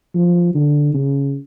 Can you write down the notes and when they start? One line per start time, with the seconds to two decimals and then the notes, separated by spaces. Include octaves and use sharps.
0.15 F3
0.55 D3
0.93 C#3